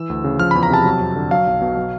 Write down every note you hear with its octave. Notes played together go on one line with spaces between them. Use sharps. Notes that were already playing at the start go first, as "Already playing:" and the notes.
Already playing: E3 E6
D2
C#3
F3 F6
E2 B5
A#5
C3 A5
F#3
F2
D3
F#3 F5
B1
B2
F#3